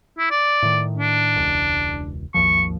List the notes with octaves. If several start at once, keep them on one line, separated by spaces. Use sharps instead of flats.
E4
D5
A2 D#3
D4
E1 C#2
G#1 D#2 F3 C#6